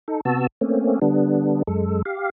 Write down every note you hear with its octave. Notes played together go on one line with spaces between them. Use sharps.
D#4 A4
C3 B3 F#4 A5 E6
A3 A#3 C4 C#4
D3 G3 B3 D4
F#2 G#3 A4
G4 F5